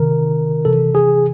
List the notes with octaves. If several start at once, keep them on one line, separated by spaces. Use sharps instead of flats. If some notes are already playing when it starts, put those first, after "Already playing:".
Already playing: C3 D#3 A#4
C3 E3 A4
G#4